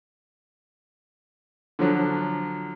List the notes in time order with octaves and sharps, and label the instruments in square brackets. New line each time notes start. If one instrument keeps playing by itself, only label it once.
[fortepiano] D3 F3 F#3